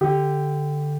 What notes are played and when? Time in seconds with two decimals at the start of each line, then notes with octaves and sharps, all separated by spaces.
0.01 D3 G4